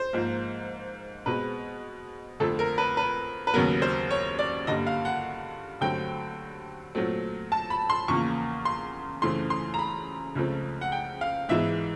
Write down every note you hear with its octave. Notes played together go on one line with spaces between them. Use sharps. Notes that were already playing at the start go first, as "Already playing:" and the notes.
Already playing: C5
G#2 F3 A#3
B2 G#3 C4 B4
F2 D3 F3 A3 C4 A4
A#4
B4
B4
B4
D#2 C#3 F#3 B3 A#4
C5
C#5
D5
G2 D3 G3 A#3 D#5
F5
F#5
G2 D3 F#3 A3 C4 G5
A#2 F#3 A3 C4
A5
B5
C6
E2 C#3 F3 A#3 C#6
C6
F#2 C#3 E3 A3 C4 C6
C6
A#5
B5
C#2 C#3 F3 A3 C4
F#5
G5
F5
G#2 E3 G#3 B3 E5